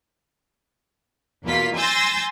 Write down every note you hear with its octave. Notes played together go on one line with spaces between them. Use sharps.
E2 B2 A#3 F4 B6
G#5 C6 E6 G6 A6 A#6